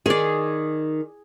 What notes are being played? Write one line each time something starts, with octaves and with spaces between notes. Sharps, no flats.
D#3 G#4 D5